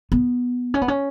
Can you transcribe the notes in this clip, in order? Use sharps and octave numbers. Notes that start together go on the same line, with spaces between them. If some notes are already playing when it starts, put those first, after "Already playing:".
B3
C#4
B3
C#4